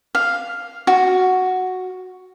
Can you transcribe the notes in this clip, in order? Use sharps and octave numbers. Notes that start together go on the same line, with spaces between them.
F5
F#4